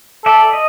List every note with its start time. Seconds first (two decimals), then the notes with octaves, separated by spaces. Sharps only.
0.25 A4 D5 E5
0.53 D#5